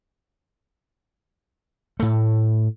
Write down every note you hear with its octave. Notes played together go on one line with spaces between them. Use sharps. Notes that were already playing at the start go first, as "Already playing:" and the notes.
A2 A3